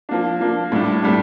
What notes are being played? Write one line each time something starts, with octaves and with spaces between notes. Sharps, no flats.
F3 A#3 D4
F3 A#3 D4
A2 G3 D4
A2 G3 D4